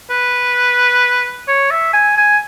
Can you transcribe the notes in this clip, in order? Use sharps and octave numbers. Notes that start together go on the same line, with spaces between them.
B4
C#5
E5
G#5
G#5